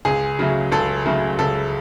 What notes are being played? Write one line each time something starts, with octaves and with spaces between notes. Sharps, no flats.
C#2 G#4
C#3 F#3 A3
C#2 A4
C#3 F#3 A3
C#2 A4